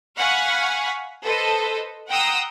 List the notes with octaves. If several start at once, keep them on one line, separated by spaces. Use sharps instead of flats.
F5 F#5 G#5 B5 C#6
A4 B4 C5 D#5
F#5 G5 A#5 C6 D#6 E6